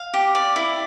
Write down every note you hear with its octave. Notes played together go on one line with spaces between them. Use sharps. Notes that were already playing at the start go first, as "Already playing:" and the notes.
Already playing: F5
G4
D5
E4